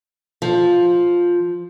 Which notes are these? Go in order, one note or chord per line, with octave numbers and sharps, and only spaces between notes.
F3